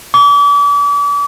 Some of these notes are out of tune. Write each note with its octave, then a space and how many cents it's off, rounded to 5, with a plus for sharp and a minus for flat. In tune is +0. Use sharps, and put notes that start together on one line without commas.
D6 -40